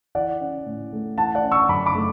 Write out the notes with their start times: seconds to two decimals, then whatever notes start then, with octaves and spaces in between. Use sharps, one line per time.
0.15 E3 D5 F#5
0.40 C#4
0.66 A2
0.93 A3
1.18 E3 F#5 A5
1.35 D5 F#5
1.43 C#4
1.52 C#6 E6
1.69 F#2 B5 D6
1.86 B5 D6
1.95 A3